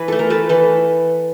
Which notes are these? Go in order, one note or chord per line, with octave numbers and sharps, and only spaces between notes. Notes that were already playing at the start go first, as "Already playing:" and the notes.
Already playing: E3 B4
A3 A4
A#4
A3 A4 B4
E3 A4 B4